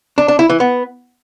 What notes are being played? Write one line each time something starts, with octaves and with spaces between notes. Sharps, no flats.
D4
D4
E4
E3
B3